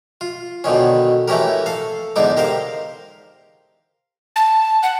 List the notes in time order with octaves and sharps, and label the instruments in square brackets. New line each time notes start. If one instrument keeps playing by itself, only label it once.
[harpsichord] F4
B2 D3 D#3 C#4
E3 A3 C#4 G4 A#4
A4 F5
E2 G#2 D3 G#3 D#4 D6
G4 A#4 C5 F5
[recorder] A5
F#5